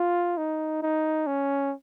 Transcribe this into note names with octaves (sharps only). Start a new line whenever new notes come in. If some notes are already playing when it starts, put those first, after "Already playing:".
Already playing: F4
D#4
D#4
C#4